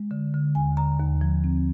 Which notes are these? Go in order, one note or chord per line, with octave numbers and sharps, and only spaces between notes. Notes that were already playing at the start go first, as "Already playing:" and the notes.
Already playing: G#3
D3
D3
D#2 G#5
D3 A#5
D#2
F3
C4